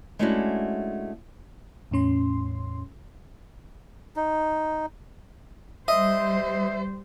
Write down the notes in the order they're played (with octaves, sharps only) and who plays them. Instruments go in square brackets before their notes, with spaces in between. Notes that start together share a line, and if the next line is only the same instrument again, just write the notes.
[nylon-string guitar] G#3 A3 C#4 D4 E4 F#4
[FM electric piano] E2 A2 C#4 C6
[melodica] D#4
[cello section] G3 C5 [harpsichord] D#5 [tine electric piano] E5